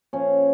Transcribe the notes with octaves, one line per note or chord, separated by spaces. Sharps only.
A#2 F3 C#4